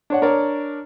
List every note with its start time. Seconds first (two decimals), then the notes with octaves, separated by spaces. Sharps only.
0.10 D4 C#5 F#5
0.22 D4 A#4 C#5 D5